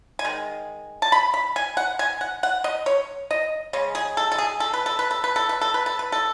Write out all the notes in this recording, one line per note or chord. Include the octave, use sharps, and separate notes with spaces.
G#5
D#3 G#3
A5
B5
B5
G#5
F#5
G#5
F#5
F#5
D#5
C#5
D#5
C#3 G#3 C#4
G#4
A4
A4
G#4
A4
B4
A4
B4
A4
B4
A4
B4
A4
B4
A4
B4
A4